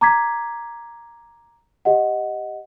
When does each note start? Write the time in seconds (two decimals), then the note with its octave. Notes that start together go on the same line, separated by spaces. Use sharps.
0.01 A#5 D6 G#6 B6
1.85 G4 D#5 F#5